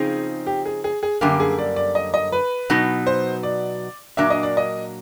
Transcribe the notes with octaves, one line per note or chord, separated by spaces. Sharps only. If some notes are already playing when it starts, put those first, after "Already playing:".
Already playing: C#3 F3 C4 D#4 G#4
G4
G#4
G#4
G#4
F#2 D3 G3 A#3 G4
G#4
D5
D5
D#5
D#5
B4
B2 F#3 B3 D#4
C5
D5
A#2 F#3 A#3 D4 E5
D#5
D5
D#5